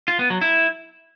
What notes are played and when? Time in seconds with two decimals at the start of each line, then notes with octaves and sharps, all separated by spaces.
0.08 F4
0.19 B3
0.30 F#3
0.41 E4